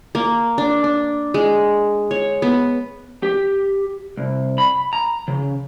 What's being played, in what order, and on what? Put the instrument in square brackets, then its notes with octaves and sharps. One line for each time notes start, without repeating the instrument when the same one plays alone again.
[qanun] A#3
D4
D4
G#3
C#5
B3
[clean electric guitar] G4
C2
B5
A#5
C#3